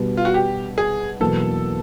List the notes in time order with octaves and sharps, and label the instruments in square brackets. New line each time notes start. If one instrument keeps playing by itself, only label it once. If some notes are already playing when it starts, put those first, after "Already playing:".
Already playing: [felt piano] B2 G3 B3
[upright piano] F4
F#4
G4
G#4
[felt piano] E2 B2 F#3 A#3 [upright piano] A4